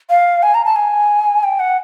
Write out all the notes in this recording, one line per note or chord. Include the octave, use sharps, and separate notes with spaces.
F5
G#5
A#5
A5
G#5
G5
F#5